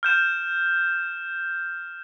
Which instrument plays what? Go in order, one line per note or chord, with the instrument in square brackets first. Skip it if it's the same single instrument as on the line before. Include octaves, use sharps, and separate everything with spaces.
[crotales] F6 G6 E7